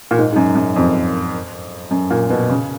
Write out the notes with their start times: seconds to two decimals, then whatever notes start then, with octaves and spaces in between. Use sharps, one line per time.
0.11 A#2
0.18 G#2
0.32 G#2
0.36 F#2
0.56 F#2
0.76 F2
1.91 F#2
2.10 A#2
2.30 B2
2.50 C#3